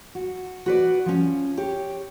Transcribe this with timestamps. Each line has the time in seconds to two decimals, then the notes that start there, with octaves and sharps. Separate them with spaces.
0.15 F#4
0.66 F#4 B4 D5
1.06 F3 C#4
1.57 G4 C#5